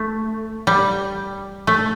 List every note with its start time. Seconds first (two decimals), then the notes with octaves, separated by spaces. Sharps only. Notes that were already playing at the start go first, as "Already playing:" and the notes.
Already playing: A3
0.67 G3
1.67 A3